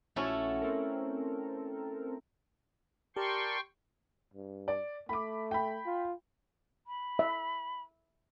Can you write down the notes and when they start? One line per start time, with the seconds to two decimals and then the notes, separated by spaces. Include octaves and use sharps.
0.16 A#1 A3 C#4 E4 F#4 A5
0.62 C4 A4 A#4
3.16 G4 A#4 D5 G5 A5 C6 C#6
4.34 G2
4.68 D5
5.09 A3 B5 D6
5.51 G5 B5
5.86 F4
6.87 B5
7.19 E5